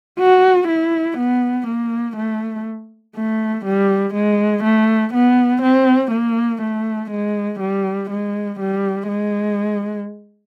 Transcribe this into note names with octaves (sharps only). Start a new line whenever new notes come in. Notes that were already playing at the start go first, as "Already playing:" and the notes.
F#4
E4
B3
A#3
A3
A3
G3
G#3
A3
B3
C4
A#3
A3
G#3
G3
G#3
G3
G#3